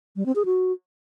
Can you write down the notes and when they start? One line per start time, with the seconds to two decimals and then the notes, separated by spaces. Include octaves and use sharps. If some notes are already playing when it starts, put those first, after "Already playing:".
0.16 G3
0.26 C4
0.36 G#4
0.45 F#4